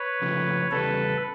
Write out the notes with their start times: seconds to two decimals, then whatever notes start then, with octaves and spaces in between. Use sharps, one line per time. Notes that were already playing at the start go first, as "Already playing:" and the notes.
Already playing: B4 C#5
0.22 F2 C#3 F3 A3
0.71 E2 C#3 G3 A4 B4